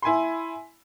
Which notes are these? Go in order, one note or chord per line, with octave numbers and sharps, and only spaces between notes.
E4 G#5 B5 C6